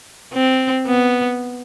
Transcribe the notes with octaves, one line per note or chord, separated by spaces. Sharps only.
C4
B3